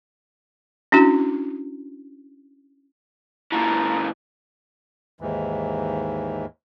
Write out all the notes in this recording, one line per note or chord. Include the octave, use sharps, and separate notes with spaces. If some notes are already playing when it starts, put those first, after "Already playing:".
C#4 D4 E4 F#4
A#2 E3 F4 A5 A#5
D#2 G#2 E3